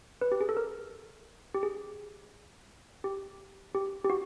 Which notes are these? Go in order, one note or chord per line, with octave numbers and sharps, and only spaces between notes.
B4
G4
G#4
A4
A#4
G4
G#4
G4
G4
G4
F#4